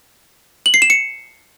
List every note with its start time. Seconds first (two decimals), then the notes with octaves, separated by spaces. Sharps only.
0.66 F#7
0.74 C7
0.82 E7
0.90 C#7